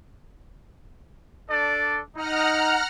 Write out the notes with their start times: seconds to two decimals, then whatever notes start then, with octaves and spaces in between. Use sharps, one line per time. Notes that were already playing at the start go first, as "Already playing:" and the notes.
1.50 D4 A4 D5
2.16 D#4 F#5 A#5 F6